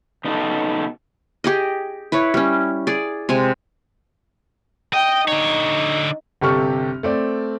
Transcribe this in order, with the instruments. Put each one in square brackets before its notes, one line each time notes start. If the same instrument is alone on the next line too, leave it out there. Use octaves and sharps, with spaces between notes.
[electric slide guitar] C#3 B3 D#4 F#4 A4
[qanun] G4 G#4 D#5
E4 B4 C#5
G3 C#4
G#4 D5
C3 G#3 G#5
[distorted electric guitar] D#5 [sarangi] G5
[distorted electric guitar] D3 C#5 [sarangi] D#4
[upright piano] G1 C3 G4 A4 C#6 F6
A3 C4 D5